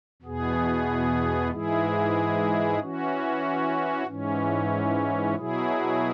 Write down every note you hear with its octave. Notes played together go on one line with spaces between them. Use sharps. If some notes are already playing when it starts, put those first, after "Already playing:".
E2 B2 B3 G#4
G#2 E3 G#3 E4 G#4
E3 C#4 F#4
G#2 E3 C#4
B2 F#3 E4 G#4